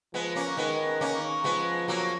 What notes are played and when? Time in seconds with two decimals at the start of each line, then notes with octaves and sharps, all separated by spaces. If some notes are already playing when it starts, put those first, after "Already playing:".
0.13 F3 G#3 B3
0.36 A#3 C#4
0.57 D#3 G#3 B3
1.01 A#3 C#4
1.44 F3 G#3 B3
1.88 F#3 A#3